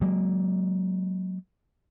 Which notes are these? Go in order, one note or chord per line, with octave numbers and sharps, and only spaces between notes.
F#3 G#3 A#3